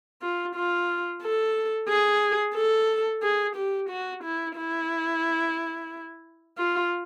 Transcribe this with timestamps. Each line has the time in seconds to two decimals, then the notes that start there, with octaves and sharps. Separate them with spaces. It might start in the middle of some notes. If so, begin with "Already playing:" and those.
0.22 F4
0.55 F4
1.23 A4
1.89 G#4
2.56 A4
3.23 G#4
3.56 G4
3.90 F#4
4.24 E4
4.57 E4
6.58 F4